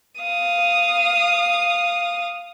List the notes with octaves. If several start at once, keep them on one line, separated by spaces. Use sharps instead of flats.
F5 D#6